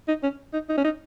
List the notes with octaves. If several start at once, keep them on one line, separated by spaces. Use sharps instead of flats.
D#4
C#4
D#4
D#4
C#4
D#4